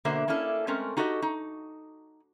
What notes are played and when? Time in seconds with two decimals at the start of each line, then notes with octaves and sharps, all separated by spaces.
0.05 B2 D3 A#3 F#4 C5 E5
0.28 A#3 C#4 D4 E4 A4
0.67 G#3 A3 C4 C#4 A#4
0.97 D#4 F#4 G4 A4 D#5
1.22 D#4